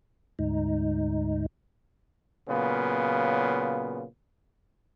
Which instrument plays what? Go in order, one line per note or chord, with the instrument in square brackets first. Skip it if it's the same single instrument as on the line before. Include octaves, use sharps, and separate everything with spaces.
[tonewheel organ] D2 G#2 D#4
[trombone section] A#2 C#3 F#3 B3